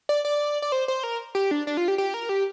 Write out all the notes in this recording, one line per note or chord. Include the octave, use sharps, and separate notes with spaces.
D5
D5
D5
C5
C5
A#4
G4
D4
D4
F4
G4
G4
A#4
G4